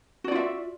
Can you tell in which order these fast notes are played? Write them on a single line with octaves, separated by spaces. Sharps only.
F#4 D5 F4 E5